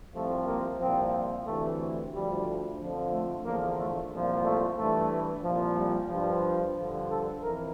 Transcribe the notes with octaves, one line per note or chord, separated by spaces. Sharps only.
C2 C3 F3 A3
A#3
C2 A#2 F3 C4
D2 C3 E3 A3
D2 D3 F3 G3
F2 D3 F3
A3
E2 D3 F3 A#3
A3
C2 A#2 F3
A3
G2 E3 A3
C2 A#2 F3
G3
G2 F3
G2 D3 F3
A4
F2 E3 A#4